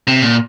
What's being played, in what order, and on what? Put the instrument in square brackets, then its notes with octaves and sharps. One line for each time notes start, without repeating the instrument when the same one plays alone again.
[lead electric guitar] C3
A#2